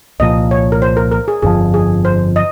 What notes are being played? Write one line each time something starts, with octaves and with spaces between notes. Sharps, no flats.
C2 A#2 F3 D#5
C#5
A#4
C5
A#4
A#4
G#4
G1 F2 C#3 F3 G#4
G#4
C5
D#5